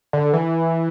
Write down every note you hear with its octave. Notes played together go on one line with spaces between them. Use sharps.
D3
E3